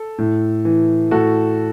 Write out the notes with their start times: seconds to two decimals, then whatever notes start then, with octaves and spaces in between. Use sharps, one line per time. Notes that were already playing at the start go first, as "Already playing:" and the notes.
Already playing: A4
0.18 A2
0.65 E3
1.11 A2 F#4 A4